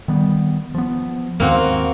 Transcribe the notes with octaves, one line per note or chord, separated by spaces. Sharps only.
D#3 G3 B3
F3 B3
D#2 G#2 A#3 C4 F#4